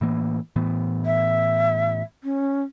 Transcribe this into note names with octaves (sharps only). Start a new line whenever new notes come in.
A2 E3 A#3
A2 E3 B3
E5
C#4